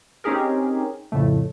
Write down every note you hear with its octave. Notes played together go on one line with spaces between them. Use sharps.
C4 C#4 D#4 G4 G#4 A#4
F2 A2 C#3 A3